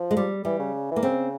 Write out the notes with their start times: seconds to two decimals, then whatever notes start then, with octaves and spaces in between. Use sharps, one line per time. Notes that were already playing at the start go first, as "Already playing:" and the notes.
Already playing: F3
0.11 G#3
0.17 G3
0.45 E3 G3
0.59 C#3
0.91 E3
0.96 A#3
1.03 C#3 C4